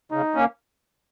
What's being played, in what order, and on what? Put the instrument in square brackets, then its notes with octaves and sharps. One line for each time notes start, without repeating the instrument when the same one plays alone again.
[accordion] C#3 [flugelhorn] D#4
[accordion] A#3 C#4